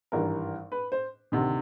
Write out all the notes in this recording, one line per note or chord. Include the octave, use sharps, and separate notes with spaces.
G#1 G2 E3 G3 A#4
B4
C5
D2 C3 D#3